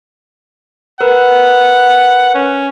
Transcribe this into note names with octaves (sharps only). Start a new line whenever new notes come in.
A#4 B4 F#5
C#4